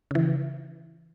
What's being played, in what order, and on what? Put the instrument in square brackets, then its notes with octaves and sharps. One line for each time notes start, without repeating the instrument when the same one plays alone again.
[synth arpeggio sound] C#3 E3